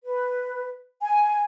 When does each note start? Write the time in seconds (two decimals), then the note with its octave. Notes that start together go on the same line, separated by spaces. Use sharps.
0.05 B4
1.02 G#5